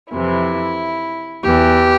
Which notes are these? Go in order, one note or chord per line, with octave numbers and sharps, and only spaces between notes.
F2 C3 E3 E4
E2 E3 G4